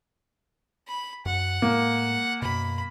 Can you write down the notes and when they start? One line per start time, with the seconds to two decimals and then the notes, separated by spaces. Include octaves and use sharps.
0.88 B5
1.26 F#2 F#5
1.62 A2 G#3 A#3
2.42 F#2 B2 B5